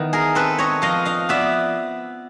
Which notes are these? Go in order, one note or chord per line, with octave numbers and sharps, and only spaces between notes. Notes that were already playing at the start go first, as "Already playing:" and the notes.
Already playing: D#3 E3 B3
G#4 A#4
C4 A4 B4
C#5 D#5
F3 D#5 F5
D#5 F5
B3 D5 E5